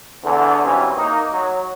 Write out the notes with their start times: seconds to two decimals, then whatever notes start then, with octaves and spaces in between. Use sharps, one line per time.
0.24 E2 D3
0.64 C#3 E3 F#3 G3 C4
0.97 A#3 D#4
1.32 F#3